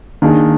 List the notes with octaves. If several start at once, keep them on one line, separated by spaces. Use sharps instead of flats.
D#3 A#3 D4 G#4